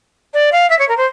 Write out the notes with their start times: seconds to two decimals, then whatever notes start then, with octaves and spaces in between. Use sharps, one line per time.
0.34 D5
0.52 F5
0.70 E5
0.79 C#5
0.88 A#4
0.97 C5